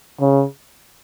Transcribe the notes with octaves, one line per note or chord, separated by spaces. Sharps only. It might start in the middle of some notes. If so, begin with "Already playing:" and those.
C#3